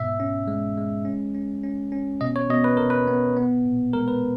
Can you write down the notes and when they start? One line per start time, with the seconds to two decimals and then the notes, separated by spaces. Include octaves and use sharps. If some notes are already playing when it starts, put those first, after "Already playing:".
Already playing: G#2 B2 E5
0.20 C#4
0.48 G#3
0.77 G#3
1.05 C#4
1.34 C#4
1.63 C#4
1.92 C#4
2.21 B2 D#5
2.36 C#5
2.49 B2 D#5
2.64 B4
2.77 B2 A#4
2.90 B4
3.07 B3
3.36 B3
3.65 A#2
3.93 G#3 A#4
4.08 B4